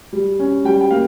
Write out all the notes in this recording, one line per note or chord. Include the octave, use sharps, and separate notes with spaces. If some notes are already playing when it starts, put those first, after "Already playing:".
G3
C#4
G3 G5
G5
A#3 F5